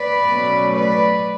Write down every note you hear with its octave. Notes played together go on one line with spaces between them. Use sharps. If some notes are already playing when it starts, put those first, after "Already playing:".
Already playing: B4 D5
B2 F#3 A3 C#4
B4 D5